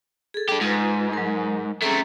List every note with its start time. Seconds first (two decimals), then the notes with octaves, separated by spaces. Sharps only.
0.34 G#4 A4
0.49 D4 G4
0.61 G#2 F4 B4
1.13 F#3 A#4
1.82 A3 C4 C#4 G#4 A#5